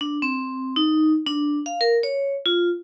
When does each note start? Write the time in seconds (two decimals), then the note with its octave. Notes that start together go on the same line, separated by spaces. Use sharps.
0.01 D4
0.22 C4
0.76 D#4
1.27 D4
1.66 F5
1.81 A#4
2.03 C#5
2.46 F4